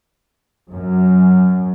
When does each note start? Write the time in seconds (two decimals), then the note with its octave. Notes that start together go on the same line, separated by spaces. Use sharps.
0.71 F#2